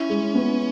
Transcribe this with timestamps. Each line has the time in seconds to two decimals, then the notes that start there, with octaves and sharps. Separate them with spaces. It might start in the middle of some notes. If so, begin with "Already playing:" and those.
Already playing: C#4 E4
0.10 G#3
0.35 B3